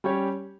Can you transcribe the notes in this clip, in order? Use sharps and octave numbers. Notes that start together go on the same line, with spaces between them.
G3 C#4 G4 C#5